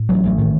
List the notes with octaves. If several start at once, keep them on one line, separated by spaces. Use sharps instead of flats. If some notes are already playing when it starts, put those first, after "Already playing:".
Already playing: A2
A1 F#3
A1
A2 D#3